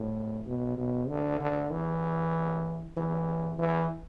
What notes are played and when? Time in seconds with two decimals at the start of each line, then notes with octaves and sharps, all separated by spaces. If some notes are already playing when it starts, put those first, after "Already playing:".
Already playing: A2
0.47 B2
0.77 B2
1.08 D3
1.41 D3
1.71 E3
2.97 E3
3.59 E3